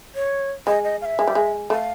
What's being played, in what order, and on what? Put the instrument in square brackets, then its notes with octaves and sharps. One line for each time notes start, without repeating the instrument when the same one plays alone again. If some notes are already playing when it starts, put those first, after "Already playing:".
[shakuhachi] C#5
[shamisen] G#3 [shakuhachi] D#5
[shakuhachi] D#5
F5
E5
[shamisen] G#3
G3
G#3
[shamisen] A3 [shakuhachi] F5